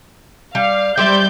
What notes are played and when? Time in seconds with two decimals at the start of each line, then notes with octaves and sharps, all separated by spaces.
0.55 G3 F5
0.98 G3 G4 C5 D5 E5 G6